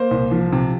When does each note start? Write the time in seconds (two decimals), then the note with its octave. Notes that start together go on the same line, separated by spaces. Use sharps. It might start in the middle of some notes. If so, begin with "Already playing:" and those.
Already playing: A#3 C5
0.11 C2
0.31 F3
0.52 C3